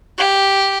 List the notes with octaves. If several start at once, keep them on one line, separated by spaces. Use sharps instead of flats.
G4